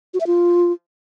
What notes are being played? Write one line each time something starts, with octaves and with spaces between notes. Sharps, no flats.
F#4
E5
F4